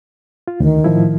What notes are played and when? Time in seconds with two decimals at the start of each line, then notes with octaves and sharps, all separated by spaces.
0.48 F4
0.60 D2 D#3
0.84 A2 F3 E4